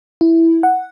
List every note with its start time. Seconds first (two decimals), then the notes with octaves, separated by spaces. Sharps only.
0.21 E4
0.63 F#5